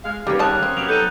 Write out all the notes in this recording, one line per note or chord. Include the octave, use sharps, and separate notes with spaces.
G#3 F5
D#2 G3 A#3 C#4 G4 B4
C#3 C#5 A5 D#6 F#6
C4
F#3 B3 G4 F7
D#4 A4 G6 D#7